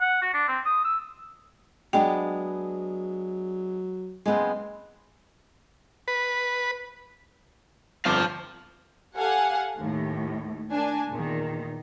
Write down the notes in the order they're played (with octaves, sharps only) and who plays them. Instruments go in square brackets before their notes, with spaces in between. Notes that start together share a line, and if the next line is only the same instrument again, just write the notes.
[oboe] F#5
F#4
D4
C4
D#6
E6
[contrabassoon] F#3 [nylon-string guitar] G#3 B3 D4 [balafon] G5
[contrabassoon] F#1 [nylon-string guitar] G#3 B3 C4
[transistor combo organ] B4
[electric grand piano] G1 F2 D6 [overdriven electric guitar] F5 A5
[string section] G4 A4 F5 F#5 G#5
D#2 A2
A#3 D4 G#5
E2 A#2 D#3